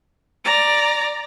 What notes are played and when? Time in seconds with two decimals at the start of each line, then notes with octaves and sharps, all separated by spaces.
0.44 D5 A#5